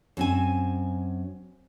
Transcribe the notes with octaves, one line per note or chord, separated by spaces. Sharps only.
F#2 C4 G#5